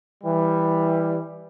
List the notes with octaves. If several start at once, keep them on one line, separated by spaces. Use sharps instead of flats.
E3 G3